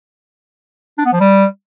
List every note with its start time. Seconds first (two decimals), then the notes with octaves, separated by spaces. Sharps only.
0.98 D4
1.05 B3
1.13 F3
1.20 G3